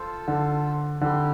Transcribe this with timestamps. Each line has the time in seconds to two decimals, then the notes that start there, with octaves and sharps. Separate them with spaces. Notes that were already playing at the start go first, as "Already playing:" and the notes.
Already playing: F4 A4 C5
0.28 D3
1.01 D3 C4 E4 G4